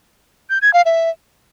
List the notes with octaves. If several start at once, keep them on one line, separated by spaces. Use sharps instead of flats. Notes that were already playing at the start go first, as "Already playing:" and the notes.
G6
G#6
F5
E5